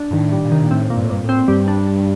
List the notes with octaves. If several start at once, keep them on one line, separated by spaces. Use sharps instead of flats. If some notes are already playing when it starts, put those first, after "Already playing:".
Already playing: D4
G2 D#3
A2
G3
A#2
C3 D#3
A#2
A2 C4
A#2
G2
A2
G2 A#2
A2
C4
G2 G3
D4
D4